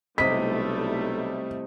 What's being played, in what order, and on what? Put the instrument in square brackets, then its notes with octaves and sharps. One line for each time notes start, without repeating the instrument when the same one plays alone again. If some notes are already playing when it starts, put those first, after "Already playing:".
[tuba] B1 [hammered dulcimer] C3 D#5 [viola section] G3 A3 E4 [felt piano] B6